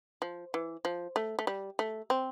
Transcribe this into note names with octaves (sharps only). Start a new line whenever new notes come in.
F3
E3
F3
A3
A3
G3
A3
C4